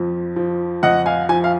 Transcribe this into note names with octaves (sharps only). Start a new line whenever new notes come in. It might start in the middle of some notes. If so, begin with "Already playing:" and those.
Already playing: F2 F3
F3
F2 D#5 F#5
F5 G#5
F3 G#5
F5